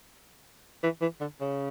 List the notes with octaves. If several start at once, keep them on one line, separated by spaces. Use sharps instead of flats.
E3
E3
D3
C#3